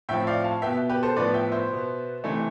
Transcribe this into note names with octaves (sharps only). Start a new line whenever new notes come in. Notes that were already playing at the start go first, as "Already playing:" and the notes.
A2 F3 C4 E5 G5
D5 F5
F5 A5
B2 B3 E5 G5
G4 B4
A4 C5
A2 F3 B3 B4 D5
E5 G5
C5 E5
B2 B3
C3 E3 A3